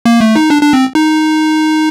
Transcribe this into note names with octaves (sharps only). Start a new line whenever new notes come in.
A#3
A3
D#4
D4
D4
C4
D#4